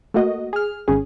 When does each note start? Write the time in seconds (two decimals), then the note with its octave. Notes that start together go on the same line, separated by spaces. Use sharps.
0.14 A3 A#3 F#4 D#5
0.53 G#4 F6
0.88 G#1 C#4 G#4